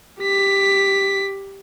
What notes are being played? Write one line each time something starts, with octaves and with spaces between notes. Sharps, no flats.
G4 B6